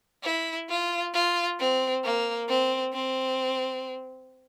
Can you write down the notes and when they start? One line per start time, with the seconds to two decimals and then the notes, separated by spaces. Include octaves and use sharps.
0.24 E4
0.69 F4
1.14 F4
1.59 C4
2.04 A#3
2.48 C4
2.94 C4